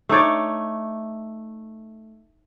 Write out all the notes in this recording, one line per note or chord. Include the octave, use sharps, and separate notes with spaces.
A3 D#4 C#5 D5